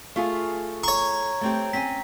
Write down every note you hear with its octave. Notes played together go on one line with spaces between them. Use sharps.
A3 F4 G#4
C#5 A#5 C#6
A3 C4 G4
C4 C#4 G#5 B6